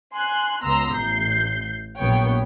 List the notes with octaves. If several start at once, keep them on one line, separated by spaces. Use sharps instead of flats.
G#5 C6 F#6
C#2 B3 A#5 C6 E6
A1 G6 C7
A#1 F#3 B3 C#5 G5